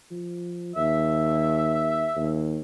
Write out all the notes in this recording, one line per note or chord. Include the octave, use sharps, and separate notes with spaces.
F3
D#2 E5
D#2